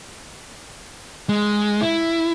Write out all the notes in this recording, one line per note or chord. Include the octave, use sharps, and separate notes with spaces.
G#3
E4